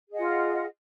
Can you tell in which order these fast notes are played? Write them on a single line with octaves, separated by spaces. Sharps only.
G#4 D#5 F#5 F4